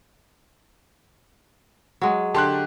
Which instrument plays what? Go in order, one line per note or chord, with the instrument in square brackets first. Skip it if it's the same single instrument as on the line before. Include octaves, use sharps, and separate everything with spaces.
[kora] F#3 G#3
[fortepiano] D3 G4 [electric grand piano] A5 C6 F#6